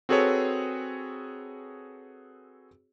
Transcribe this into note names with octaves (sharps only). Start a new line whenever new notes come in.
C4 F#4 G#4 A4 B4 C#5